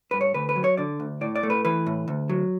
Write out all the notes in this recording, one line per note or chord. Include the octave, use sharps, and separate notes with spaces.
G2 B4
C#5
D2 B4
B4
F#3
C#5
D3 D5
D2
A2 D5
D5
A3
B4
E3 B4
A2
D2
F#3